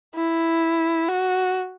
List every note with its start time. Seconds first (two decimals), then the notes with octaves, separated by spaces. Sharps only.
0.15 E4
1.08 F#4